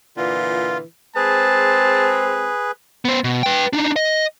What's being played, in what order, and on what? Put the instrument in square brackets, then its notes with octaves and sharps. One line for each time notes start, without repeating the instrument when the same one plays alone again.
[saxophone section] A#2 D3 E3 [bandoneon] F4
[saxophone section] G#3 C4 [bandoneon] G#4 B4 [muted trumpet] A5
[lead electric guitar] B3 C5
B2
B4 G5
D4 D#4
D#5